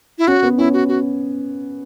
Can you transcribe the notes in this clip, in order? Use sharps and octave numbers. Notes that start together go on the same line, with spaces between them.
E4
C#4 F#4
B3
C#4 E4
F#4
F#4